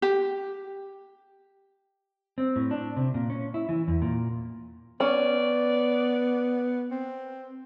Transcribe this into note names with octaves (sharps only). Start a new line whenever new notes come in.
G4
C4
A2
D4
C3
A#2
C#4
E4
E3
E2
A#2
B3 C#4 D5
C4